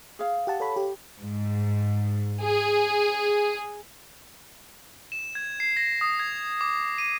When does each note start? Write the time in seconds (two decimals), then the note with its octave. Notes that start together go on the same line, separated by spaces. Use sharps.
0.19 G#4 F5
0.47 G4 F#5 A5
0.60 A4 C#5 B5
0.76 G4
1.19 G#2
2.42 G#4
5.12 E7
5.35 G#6
5.60 C7
5.77 A#6
6.01 D#6
6.19 G#6
6.61 D6
6.98 D#7